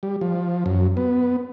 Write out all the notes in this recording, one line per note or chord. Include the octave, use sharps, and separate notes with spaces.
G3
F3
F#2
B3